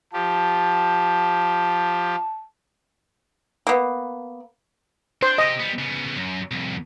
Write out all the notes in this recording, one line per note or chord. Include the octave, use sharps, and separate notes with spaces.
F3 G4 A5
A#3 B3
D4 C5
C4 G4 D#5
G3 B3
C#3 B3
F#2
C2 F2